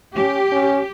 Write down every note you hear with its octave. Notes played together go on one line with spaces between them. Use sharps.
C#4 G4
C#4